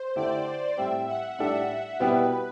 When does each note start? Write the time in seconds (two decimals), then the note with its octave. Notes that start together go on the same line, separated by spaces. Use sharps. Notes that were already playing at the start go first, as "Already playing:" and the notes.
Already playing: C5
0.16 D3 A3 E4 G4 D5
0.77 A2 G3 C4 E4 E5
1.07 F#5
1.39 A2 G3 D4 A4 E5
2.00 B2 G3 B3 E4 G4 B4